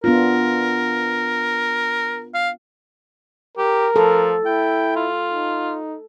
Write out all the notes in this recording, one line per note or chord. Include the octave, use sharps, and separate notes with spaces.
B3 D4 F4 A#4
F5
G4 A#4
F3 A4
E4 G5
F4
D#4